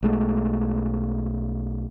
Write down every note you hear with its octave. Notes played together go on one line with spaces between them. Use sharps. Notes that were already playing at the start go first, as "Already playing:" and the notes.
B1 G#3 A3